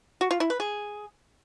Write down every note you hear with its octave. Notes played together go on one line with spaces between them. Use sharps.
F#4
F4
E4
B4
G#4